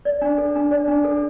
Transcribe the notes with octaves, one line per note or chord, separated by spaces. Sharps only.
D5
D4
A4
D4
D5
D4
A4